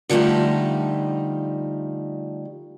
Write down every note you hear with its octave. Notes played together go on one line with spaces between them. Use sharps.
D3 F3 G3 A3 D#4